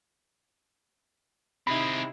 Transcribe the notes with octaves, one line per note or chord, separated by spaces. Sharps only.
C3 C4 D#4 E4 G#4 B5